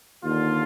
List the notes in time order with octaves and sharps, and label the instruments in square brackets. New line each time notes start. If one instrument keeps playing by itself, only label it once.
[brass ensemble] D#2 D3 F4